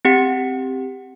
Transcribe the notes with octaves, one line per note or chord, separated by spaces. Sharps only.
C4 G4 F#5 C#7